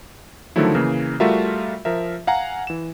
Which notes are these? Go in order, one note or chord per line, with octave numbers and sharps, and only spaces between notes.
D3 D#3 F3 F#3 A3 E4
C#3 E3 A#3
G3 A3 F4 F#4 A#4 E5
F3 A#4 E5
F5 F#5 G#5 A#5
E3 E7